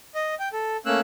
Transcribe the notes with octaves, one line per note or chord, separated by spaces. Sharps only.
D#5
G5
A4
A3 A#3 C#4 E6 F#6